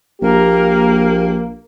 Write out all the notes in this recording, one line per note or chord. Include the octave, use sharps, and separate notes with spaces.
A#1 A#3 G4 A#4